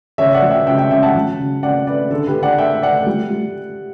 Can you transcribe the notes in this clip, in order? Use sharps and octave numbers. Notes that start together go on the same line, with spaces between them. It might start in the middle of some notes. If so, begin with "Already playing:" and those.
C#3 C#5 E5
D5 F#5
F#3
E5 G5
C#3 E5 G5
E5 G5
C#3 E5 G5
F#5 A5
F#3
C#3
C#3 D5 F#5
A3 B4 D5
D3 A4
G4 B4
D3
D5 F#5
A3 E5 G5
A3 D5 F#5
G3
G3